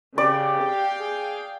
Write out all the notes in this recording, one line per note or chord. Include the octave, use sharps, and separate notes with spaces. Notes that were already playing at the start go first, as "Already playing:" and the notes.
C#3 G4 D5
F5 G5
G#4